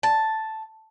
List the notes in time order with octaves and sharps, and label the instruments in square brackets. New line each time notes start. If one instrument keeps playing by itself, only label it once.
[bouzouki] A5